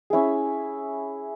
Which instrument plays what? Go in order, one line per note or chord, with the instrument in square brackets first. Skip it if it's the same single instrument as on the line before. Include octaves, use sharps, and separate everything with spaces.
[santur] C#4 E4 G#4